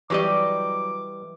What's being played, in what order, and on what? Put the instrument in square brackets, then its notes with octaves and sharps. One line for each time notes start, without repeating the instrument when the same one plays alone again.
[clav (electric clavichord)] E3 G3 D#5 [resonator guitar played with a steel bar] F#3 G4 D5 [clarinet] D6